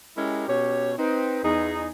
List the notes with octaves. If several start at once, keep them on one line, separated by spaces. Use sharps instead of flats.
G#3 C#4 E4 G4 A#4 C#5
B2 C#4 G4 C#5
C4 D#4 B4
E2 D#4 G#4